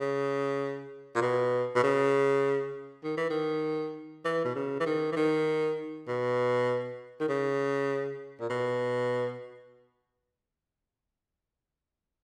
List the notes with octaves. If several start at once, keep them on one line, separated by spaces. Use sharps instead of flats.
C#3
A#2
B2
B2
C#3
D#3
E3
D#3
E3
B2
C#3
E3
D#3
E3
D#3
B2
D#3
C#3
A#2
B2